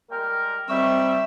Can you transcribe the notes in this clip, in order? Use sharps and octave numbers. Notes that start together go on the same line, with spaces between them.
G3 G#3 A#4 G5
G3 C4 D#4 E5 C#6